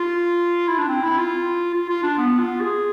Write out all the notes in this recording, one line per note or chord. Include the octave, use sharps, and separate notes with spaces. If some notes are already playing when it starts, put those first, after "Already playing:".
Already playing: F4
E4
D4
C4
E4
F4
F4
F4
D4
B3
F4
G#4